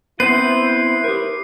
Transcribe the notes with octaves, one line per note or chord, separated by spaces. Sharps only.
B3 C4 E4 B4 C5 C7
G4 A#4